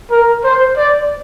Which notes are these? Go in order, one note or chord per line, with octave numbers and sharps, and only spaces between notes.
A#4
C5
D5